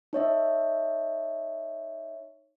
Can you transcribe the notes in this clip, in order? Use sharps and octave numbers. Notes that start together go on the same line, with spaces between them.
D#4 C#5 D#5 E5